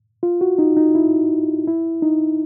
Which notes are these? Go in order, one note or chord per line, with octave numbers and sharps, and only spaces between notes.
F4
F#4
D#4
D#4
E4
E4
D#4